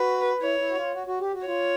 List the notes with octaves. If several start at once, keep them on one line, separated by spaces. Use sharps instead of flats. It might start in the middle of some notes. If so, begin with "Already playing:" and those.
Already playing: F#4 B4
E4 C#5
E4
F#4
F4
F#4
F#4
G4
F#4
F4 C#5